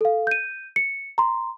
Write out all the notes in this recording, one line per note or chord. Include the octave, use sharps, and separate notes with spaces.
A4 F5
G6 D#7
C#7
A#5 C6